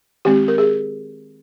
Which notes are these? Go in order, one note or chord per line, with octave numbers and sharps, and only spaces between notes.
D#3 G#3 C4 G4
A#4
G#4